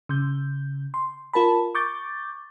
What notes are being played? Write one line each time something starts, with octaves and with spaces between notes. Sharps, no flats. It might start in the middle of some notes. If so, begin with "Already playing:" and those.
C#3 G6
C6
F4 A#4 A5 B5
C#6 D6 G6 A6